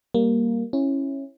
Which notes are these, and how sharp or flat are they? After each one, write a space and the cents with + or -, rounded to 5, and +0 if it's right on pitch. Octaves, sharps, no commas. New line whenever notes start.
G3 +0 A#3 +0
C#4 -20 E4 +0